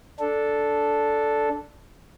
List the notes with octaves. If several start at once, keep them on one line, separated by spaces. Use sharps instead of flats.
D4 A4